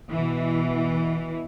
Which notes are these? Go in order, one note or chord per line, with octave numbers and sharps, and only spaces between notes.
B2 E3